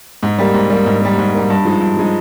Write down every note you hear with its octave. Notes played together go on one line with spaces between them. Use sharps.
G#2
G3 A#3
G#2
G3 A#3
G#2
G3 A#3
G#2
G3 A#3
G2
F3 G#3 D#4
G2
F3 G#3 D#4